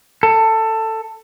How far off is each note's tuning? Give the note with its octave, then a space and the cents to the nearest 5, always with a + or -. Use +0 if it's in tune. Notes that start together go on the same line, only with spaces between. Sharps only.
A4 +15